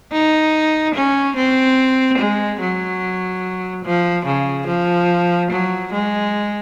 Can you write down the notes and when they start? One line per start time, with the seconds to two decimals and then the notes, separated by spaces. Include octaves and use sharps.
0.12 D#4
0.95 C#4
1.36 C4
2.19 G#3
2.61 F#3
3.85 F3
4.26 C#3
4.68 F3
5.51 F#3
5.92 G#3